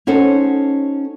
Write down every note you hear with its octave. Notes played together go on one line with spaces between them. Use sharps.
C#4 D#4 F#4 A4 C5